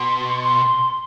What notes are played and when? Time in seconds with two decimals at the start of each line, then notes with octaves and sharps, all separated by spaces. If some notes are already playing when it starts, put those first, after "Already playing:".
Already playing: B2 C6
0.42 C6